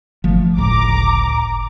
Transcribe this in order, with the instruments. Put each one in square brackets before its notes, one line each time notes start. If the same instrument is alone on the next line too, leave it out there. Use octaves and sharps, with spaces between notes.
[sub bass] G1 [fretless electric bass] F3 A3
[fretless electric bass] C#2 A2 [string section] A#5 D6